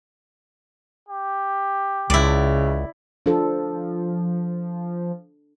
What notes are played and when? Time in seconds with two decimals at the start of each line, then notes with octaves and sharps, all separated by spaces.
1.09 G4
2.10 C#2 C#3 E4 D5
3.26 F3 D4 A4